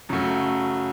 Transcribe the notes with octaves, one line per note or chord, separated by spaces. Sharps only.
F#2 C#3 F#3 A3